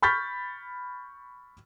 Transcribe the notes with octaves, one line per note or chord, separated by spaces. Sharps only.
B5 C#6 F6 G6 A6 B6